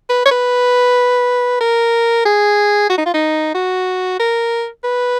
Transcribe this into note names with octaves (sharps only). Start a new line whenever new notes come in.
B4
C#5
B4
A#4
G#4
F#4
D#4
F4
D#4
F#4
A#4
B4